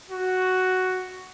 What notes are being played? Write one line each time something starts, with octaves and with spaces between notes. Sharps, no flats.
F#4